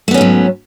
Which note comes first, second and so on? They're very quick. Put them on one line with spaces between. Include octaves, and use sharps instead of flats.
A3 B3 C#4 G#2 F#3